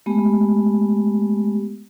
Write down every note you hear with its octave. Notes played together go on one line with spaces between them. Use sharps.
G#3 A3 B3 G4